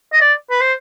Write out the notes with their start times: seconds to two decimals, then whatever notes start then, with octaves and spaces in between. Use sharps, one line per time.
0.13 D#5
0.21 D5
0.50 B4
0.61 C5